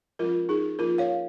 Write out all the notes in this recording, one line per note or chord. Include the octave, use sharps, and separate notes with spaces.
F3 G#3 C#4 F4 A#4
D#4 G#4
F3 A#3 C#4 F4 A#4
C#5 F5